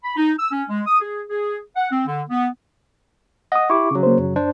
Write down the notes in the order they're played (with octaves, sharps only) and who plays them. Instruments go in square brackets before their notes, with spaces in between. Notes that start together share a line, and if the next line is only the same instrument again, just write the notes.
[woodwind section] B5
D#4
E6
C#4
G#3
D#6
G#4
G#4
F#5
C4
D3
B3
[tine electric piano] D#5 [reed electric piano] F#5 D#6
[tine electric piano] E4 G4 [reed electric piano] C#6 D6
[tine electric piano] C#3 F#3
[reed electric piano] A#3 C5
F#2
[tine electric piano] D4 C5